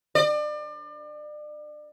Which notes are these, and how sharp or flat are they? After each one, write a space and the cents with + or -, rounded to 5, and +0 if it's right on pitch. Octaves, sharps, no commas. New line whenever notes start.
D5 +35